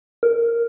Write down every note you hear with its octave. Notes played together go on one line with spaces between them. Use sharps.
A#4